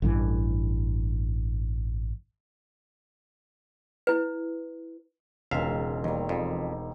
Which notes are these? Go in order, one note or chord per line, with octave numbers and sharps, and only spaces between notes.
A1 G2 E3
E4 B4
E1 C#2 D#3 C5 E5 F5
D#2 D#3 E3 G3
F2